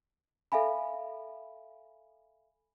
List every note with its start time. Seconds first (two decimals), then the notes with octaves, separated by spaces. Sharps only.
0.52 A4 E5 F5 G#5 B5